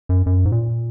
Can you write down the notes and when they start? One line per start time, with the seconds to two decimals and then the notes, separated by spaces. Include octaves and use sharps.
0.09 F#2
0.26 F#2
0.45 G#2
0.52 A#2